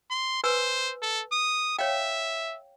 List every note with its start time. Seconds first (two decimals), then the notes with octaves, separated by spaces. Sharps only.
0.10 C6
0.44 B4 C5 G#5 E6
1.02 A4
1.32 D#6
1.79 C#5 E5 F5 G5